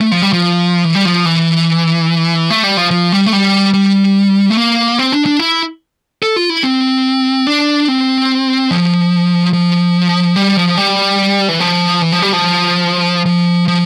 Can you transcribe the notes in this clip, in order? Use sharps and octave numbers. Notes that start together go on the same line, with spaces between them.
A3
F3
G3
F3
E3
G3
F3
E3
A3
G3
F3
F3
G3
A3
G3
G3
A3
A#3
C4
D4
D4
E4
A4
F4
E4
C4
D4
C4
F3
F3
G3
F3
G3
E3
F3
E3
F3
G3
F3
F3
F3